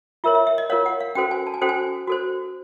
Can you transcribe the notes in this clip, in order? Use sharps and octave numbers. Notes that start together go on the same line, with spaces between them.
F4 A#4 C#5 E5
E5
E5
D#5
F4 A#4 C#5 F5
F#5
F5
C#4 F#4 A4 C5 G5
G#5
A5
G#5
C#4 F#4 A4 C5 G5
G#5
F#4 A4 C5